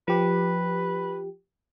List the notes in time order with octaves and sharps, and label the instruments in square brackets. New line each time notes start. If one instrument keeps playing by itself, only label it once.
[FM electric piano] F3 G4 [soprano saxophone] B4